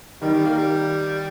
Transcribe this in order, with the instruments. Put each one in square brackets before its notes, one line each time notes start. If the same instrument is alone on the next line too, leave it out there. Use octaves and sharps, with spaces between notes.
[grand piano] D#3 [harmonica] G3
[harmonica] G3
A#3
G3